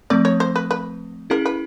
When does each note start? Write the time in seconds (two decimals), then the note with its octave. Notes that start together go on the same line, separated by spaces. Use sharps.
0.10 F3 A3 C4 D5
0.25 C#5
0.40 C5
0.56 B4
0.71 B4
1.30 C#4 E4 G#4 A#4
1.46 B4